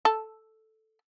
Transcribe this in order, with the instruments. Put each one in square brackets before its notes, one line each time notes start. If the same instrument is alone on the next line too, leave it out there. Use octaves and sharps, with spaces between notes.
[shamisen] A4